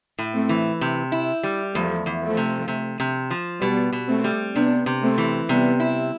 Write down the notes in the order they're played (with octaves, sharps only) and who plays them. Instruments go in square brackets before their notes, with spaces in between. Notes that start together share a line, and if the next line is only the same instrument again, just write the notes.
[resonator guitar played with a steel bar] A2
[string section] A3 C4
[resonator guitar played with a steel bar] E3
C3
E4
G3
[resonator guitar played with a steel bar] E2 [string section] F3 A3
[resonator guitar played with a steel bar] E2
[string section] F3 A3
[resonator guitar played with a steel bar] C3
C3
C3
F3
[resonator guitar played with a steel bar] B2 [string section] G3 B3
[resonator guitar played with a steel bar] B2
[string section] A3 C4
[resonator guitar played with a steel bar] G3
[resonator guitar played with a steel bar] C3 [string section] B3 D4
[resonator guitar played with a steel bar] C3
[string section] A3 C4
[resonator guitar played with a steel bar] E3
[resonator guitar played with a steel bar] C3 [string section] G3 B3
[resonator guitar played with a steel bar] E4